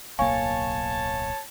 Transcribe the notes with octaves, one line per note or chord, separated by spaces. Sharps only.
D1 B1 A#3 C#5 F5 G#5 A5 C#6